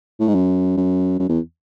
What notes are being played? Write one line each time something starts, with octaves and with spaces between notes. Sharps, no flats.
A2
G#2
F#2
F#2
F#2
E2